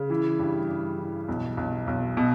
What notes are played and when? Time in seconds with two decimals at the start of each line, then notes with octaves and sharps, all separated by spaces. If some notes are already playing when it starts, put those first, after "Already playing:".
Already playing: C#3
0.10 E3
0.39 G2
0.69 G2
0.98 E3
1.29 B1
1.57 B1
1.87 B1
2.17 B2